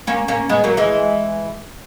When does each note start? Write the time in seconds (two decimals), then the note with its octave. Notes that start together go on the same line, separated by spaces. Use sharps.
0.07 A#3 C#4
0.28 A#3 C#4
0.49 G#3 B3
0.64 F#3 A#3
0.77 E3 G#3